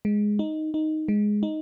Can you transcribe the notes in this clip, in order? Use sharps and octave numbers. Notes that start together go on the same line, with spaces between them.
G#3
D#4
D#4
G#3
D#4